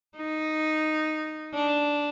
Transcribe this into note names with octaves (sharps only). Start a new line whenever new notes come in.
D#4
D4